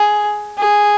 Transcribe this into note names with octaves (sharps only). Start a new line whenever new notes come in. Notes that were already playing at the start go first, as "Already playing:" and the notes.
Already playing: G#4
G#4